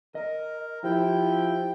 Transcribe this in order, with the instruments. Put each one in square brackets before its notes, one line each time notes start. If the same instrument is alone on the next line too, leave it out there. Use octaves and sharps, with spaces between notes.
[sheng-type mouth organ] A#4 [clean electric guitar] D#5
[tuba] F3 [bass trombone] E4 [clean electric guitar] G4 C5 [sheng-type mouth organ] G5